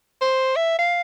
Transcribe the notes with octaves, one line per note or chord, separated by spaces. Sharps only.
C5
E5
F5